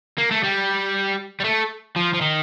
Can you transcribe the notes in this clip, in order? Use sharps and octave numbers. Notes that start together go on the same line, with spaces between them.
A#3
A3
G3
G3
A3
F3
F3
D#3